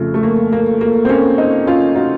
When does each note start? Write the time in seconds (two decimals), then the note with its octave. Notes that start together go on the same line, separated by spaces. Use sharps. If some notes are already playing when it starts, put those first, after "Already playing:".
Already playing: F2 C#3 F3 A3
0.14 A3
0.23 A#3
0.53 A#3
0.81 A#3
1.05 C4
1.09 A#3 C#4
1.38 C4 D#4
1.67 C#4 F4
1.96 D#4 F#4